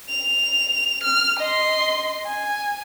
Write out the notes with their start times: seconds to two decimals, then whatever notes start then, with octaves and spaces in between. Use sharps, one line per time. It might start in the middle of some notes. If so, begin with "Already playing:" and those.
0.10 F7
1.04 F6
1.39 D#5 C6
2.26 G#5